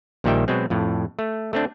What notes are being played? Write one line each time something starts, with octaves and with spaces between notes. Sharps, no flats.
A#1 A#2 D#3 G3 E5 G5
B2 F#3 G#3 C4
F2 A2
A3
A3 C4 D4